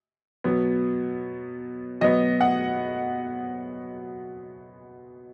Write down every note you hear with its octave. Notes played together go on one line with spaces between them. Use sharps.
B2 F#3 B3
B2 F#3 B3 D#5
F#5